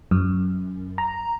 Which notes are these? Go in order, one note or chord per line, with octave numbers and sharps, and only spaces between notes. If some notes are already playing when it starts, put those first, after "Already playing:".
F#2
A#5